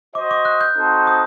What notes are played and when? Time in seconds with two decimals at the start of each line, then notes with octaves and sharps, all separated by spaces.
0.15 F#4 C5 D#5 D6
0.31 D6
0.45 F#6
0.61 G6
0.76 C4 D#4 F#4 A4 C5
1.07 D#6